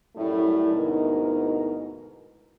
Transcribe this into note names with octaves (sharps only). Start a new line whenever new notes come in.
F#2 A2 G3 A3 E4
D2 G#2 B2 D#4 E4 A#4